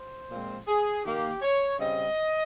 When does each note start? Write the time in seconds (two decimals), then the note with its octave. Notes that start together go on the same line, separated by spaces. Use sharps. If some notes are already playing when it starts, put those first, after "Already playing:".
Already playing: C5
0.31 A#2 F3 G#3 C4
0.68 G#4
1.05 D#3 A#3 G4
1.42 C#5
1.79 C#3 G3 C4 D#5